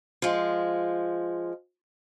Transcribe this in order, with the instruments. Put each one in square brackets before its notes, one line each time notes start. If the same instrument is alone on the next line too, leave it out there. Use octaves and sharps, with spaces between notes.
[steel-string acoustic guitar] F3 G#3